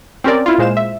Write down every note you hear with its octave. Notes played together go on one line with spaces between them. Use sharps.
C4 C#4 G4 A#4 D5
E4 F4
A#2 G#3 C5 F5 E7
E5